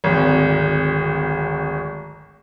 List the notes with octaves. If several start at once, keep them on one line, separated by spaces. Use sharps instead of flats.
D1 G#1